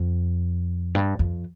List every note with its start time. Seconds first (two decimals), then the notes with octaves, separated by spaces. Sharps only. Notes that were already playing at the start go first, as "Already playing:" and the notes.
Already playing: F2
0.95 G2
1.19 F2